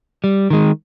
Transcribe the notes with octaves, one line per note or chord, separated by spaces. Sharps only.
G3
D#3 G#3